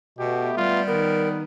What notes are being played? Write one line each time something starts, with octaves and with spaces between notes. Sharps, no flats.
B2 A3 B3 G4
G3 F4
D#3 B3 A#4